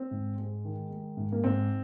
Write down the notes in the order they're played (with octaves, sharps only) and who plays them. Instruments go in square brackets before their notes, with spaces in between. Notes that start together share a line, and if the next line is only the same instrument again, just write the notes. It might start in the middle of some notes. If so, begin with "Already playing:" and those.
Already playing: [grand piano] C4
G#2
G#3
D#3
G#3
G#2
A#3
G#2 C4